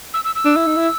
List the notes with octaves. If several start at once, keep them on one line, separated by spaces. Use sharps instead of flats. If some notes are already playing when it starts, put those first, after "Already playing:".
E6
E6
E6
D4
E4
D#4
E4